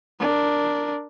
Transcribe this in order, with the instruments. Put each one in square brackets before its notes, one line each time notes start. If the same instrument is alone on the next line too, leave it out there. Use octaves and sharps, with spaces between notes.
[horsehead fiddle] D4 A#4